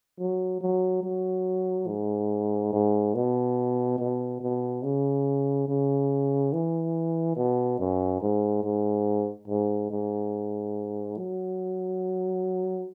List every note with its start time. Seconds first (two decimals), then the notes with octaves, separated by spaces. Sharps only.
0.19 F#3
0.61 F#3
1.03 F#3
1.87 G#2
2.73 G#2
3.15 B2
3.99 B2
4.41 B2
4.83 C#3
5.68 C#3
6.53 E3
7.37 B2
7.80 F#2
8.22 G#2
8.64 G#2
9.48 G#2
9.90 G#2
11.18 F#3